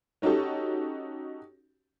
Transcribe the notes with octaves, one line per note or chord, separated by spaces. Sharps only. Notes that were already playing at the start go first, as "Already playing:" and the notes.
C#4 D#4 F#4 G4 A4